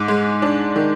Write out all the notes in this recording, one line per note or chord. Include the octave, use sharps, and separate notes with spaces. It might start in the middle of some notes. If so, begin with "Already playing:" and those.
Already playing: G#2 D6
G#3
D4
D#3